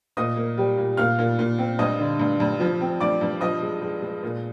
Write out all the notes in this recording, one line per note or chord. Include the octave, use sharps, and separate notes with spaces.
A#2 D#5 D#6
A#3
G3
A#2
A#2 F5 F6
A#2
A#2
C4
G2 D#5 D#6
D3
G2
G2
F3
C4
G2 D5 D6
G2
F3 D#5 D#6
G#3
G#3
G#3
A#2